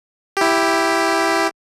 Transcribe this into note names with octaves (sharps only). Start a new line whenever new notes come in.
E4 G4